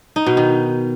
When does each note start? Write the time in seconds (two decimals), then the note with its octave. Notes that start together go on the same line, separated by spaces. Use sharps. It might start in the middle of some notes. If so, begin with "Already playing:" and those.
0.16 D#4
0.26 B2
0.37 D#3